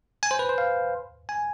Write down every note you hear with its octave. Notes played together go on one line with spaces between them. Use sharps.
G#5
C5
B4
C5
F5
G#5